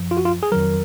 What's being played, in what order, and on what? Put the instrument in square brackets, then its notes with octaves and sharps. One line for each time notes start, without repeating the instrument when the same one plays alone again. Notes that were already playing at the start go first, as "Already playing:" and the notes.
Already playing: [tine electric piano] F#2 F3
F4
F#4
F4
G#4
F2 D#3 F#3 A#4